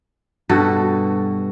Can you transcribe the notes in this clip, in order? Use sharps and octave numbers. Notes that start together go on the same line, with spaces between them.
G2 B2 F#4 A4